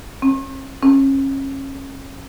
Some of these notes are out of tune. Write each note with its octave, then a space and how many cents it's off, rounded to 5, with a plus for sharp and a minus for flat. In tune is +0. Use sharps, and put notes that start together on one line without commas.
C#4 -45
C#4 -30